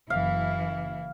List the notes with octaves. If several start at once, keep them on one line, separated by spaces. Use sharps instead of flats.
F#1 E3 E4 F5